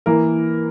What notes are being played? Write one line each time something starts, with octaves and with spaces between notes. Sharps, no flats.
E3 A#3 A#4